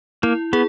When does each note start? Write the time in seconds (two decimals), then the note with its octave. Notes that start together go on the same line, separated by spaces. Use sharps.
0.23 A#3 E4
0.53 B3 G#4